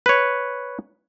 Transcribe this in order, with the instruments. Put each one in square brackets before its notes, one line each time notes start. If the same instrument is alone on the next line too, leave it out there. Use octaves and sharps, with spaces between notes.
[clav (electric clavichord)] B4 C#5